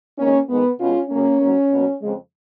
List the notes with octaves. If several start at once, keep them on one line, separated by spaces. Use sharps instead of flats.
F2 D#3 G#3 A#3 C#4
G#2 D#3 G#3 B3
B2 G#3 C#4 F4
F#2 C#3 F#3 A#3 C#4
G#2 F#3 A#3
B2 F#3 A#3
F2 C#3 G#3